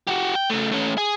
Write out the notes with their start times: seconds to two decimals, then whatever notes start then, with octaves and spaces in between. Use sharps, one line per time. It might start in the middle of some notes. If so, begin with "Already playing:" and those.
0.07 F#4 G4
0.35 G5
0.50 C#3 A3
0.72 A3 C#4
0.98 G#4